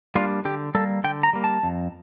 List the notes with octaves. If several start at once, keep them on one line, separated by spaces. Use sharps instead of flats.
G3 A#3 D4 F4
D3 G4
G3 A#3 A4
D3 G5
A#5
G3 A#3
A5
F2